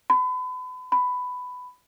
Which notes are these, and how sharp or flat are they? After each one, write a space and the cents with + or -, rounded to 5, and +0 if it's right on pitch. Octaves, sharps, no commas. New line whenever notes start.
B5 +35
B5 +10